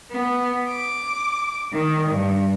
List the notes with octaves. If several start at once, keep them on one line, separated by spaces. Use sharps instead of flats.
B3
D6
D#3
G2